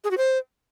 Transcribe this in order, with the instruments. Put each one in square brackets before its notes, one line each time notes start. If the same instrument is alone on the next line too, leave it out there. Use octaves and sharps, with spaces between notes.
[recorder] G#4
F#4
C5